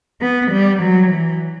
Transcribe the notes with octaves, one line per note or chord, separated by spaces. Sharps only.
B3
G3
F#3
E3